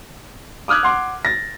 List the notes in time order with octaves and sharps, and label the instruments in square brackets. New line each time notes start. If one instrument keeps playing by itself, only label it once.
[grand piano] D6 D#6 F6 F#6 G#6
F#5 C6 D6
A6 A#6